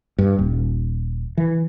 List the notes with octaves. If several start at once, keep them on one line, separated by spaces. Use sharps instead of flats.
G2
D#1
E3